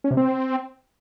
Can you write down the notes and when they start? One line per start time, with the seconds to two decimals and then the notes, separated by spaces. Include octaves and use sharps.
0.04 C#4
0.11 C3
0.17 C4